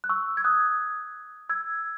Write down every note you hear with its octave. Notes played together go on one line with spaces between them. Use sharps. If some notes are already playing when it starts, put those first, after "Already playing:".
F#6
C#6 E6
G#6
D#6 F#6
E6 G#6